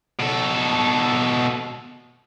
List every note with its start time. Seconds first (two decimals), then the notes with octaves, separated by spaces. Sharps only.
0.20 B2 A4